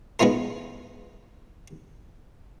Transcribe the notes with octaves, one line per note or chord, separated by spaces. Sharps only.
G#3 B3 D#4 F4 A#4